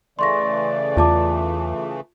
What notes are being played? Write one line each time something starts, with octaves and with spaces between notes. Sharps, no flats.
C#3 E3 A3 D5 C6 C#6 A#6
E2 F4 A5 D6